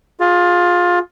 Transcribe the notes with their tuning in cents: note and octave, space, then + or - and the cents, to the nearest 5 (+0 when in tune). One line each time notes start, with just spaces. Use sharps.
F4 +20 G#4 +0